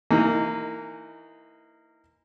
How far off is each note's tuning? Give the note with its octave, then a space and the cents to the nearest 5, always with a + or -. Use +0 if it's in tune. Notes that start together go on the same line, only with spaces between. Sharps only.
E3 +0 A#3 -25 D#4 +0